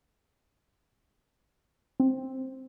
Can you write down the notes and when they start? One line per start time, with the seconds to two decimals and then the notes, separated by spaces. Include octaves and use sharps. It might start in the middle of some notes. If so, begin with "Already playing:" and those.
2.00 C4